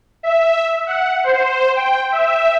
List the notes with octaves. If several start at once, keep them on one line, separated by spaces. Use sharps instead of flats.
E5
F#5
C5
G5
E5